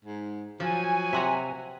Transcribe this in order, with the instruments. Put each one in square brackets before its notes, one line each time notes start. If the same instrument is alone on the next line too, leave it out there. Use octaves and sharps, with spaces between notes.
[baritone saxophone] G#2
[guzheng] F3 [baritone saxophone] F#3 [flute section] G#5
[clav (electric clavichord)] C3 [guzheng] E5 F#5 A#5